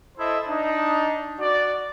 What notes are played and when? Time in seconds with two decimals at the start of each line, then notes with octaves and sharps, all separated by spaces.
0.17 E4 A4 C5 D#5 E5
0.47 D4 D#4
1.39 F#4 D5